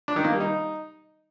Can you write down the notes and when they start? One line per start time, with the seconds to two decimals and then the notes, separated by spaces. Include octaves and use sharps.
0.08 D4
0.16 D#3
0.24 A#3
0.32 G3
0.40 D#4